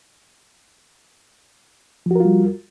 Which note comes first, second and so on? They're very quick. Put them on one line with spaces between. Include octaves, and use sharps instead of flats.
F3 F#4 A#4 F4 G3